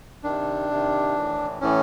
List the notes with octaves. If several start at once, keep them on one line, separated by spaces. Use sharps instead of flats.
C3 D#3 D4
C3 D#3
A2 E3
A2 E3 C#4